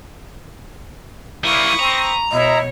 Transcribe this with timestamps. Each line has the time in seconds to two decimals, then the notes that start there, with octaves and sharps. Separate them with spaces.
1.44 G3 A#3 E4 B5 C#6 D#6
1.79 C4 A#5
2.32 B2 E4 C#5 D#5